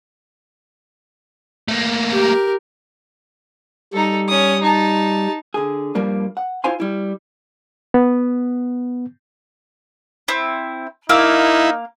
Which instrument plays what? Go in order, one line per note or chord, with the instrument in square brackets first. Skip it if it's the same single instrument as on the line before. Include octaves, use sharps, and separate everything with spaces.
[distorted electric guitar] A3 A#3
[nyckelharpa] G4 A#4
[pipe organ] G3 [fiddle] D#4 A4
[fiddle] C#4 D#6
D#4 A5
[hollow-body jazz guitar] D3 G#4
G2 F3 G3 A#3 D4
F#5
E4 F4 C5 F5 G#5 C6
G3 E4
[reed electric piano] B3
[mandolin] C4 E4
[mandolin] A#3 F5 E6 [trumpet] D#4 [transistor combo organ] E4